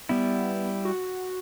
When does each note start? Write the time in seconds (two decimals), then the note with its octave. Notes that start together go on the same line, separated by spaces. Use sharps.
0.09 G3 B3 E4
0.85 F#4